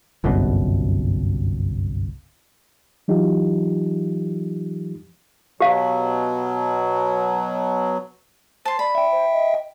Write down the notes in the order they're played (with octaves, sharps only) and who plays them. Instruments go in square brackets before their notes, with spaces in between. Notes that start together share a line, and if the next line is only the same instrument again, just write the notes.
[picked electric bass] G1 C2 F#2 B2
[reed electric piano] E3 F#3 D#4 F4 G4
[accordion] B2 F#3 [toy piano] G4 F5
[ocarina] C5 [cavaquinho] A5 C6
[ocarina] D5 [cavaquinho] B5
[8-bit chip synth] E5 G5
[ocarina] C5
D#5